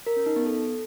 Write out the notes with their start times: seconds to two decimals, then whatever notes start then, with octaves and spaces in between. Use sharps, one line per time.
0.07 A#4
0.16 C#4
0.26 D#4
0.36 B3
0.46 A4